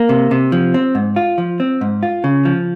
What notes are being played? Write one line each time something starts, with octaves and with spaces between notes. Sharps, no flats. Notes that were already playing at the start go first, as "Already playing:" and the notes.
Already playing: A#3
C3
C3
F3
C4
G#2
F4
F3
C4
G#2
F4
C#3
F3